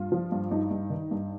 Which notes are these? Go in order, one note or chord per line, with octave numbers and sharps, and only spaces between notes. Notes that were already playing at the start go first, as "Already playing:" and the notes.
Already playing: G2 F4
F3
G2
G2 D#4
G2
D#3
G2